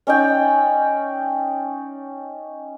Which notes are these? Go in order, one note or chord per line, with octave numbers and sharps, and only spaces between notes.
C#4 D#4 D5 G5